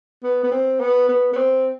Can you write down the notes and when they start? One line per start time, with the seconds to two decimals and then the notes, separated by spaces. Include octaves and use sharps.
0.24 B3
0.44 B3
0.52 C4
0.80 B3
1.09 B3
1.33 B3
1.37 C4